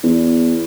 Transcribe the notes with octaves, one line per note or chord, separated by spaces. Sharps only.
E2